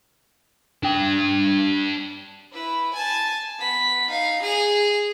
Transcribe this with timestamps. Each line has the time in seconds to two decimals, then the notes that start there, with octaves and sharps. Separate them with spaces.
0.83 D4 G5
2.52 E4 B4
2.94 G#5 A5
3.59 B3 B6
4.09 D#4 F5
4.42 G#4 F7